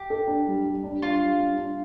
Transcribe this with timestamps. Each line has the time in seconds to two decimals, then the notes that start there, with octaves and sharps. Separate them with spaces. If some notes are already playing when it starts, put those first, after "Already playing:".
Already playing: G4
0.10 A4
0.27 D4
0.47 G3
0.65 G3
0.84 D4
1.02 D4 F4
1.20 G3
1.40 D4
1.58 D4